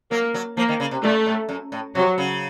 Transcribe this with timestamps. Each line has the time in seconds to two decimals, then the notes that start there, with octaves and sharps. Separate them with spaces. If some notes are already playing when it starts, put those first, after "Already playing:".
0.11 F#3 A#3
0.34 F#3
0.57 F3 A#3
0.69 D#3
0.80 C#3
0.91 C3
1.03 A#2 A3
1.26 A2
1.49 F#2
1.72 A2
1.95 C3 F#3
2.18 C#3